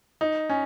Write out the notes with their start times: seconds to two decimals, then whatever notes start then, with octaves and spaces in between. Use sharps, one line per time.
0.21 D#4
0.49 C#4